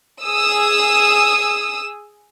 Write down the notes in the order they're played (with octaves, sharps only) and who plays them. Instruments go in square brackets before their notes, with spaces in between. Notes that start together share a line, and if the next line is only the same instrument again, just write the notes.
[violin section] G#4 D#6 E6